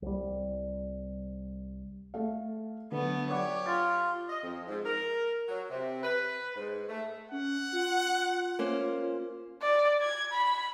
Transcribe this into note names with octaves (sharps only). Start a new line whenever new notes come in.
C2 G3
A3 A4 F5
D3 F#3 A3 B3 B4
G4 C#5 D5 F#5 D6
F4 A6
D#5
F2
G#2
A#4
F#3
C3
B4
G#2
A3
C#4 F#5
F4
A#3 C#4 C5
D5
G#6
B5